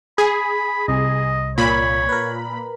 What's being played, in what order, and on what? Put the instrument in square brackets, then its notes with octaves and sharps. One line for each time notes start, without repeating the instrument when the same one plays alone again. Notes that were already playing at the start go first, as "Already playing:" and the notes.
[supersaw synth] G#4 [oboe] B5
[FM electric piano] C2 C3 [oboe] D#5
[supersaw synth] A#2 B5 [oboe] C#5
[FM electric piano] A#4 B4